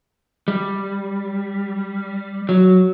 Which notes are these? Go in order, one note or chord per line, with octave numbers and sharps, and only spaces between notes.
G3
F#3